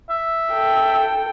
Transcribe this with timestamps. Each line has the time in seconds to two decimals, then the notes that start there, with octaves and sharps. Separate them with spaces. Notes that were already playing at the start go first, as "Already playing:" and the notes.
0.10 E5
0.53 A4 G5